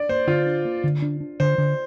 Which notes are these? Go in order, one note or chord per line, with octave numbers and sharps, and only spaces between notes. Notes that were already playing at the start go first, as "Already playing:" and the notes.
Already playing: D4 D5
A#3 C5
D3 F4
D4
A#3
D3
D4
D4
D3 C5
D3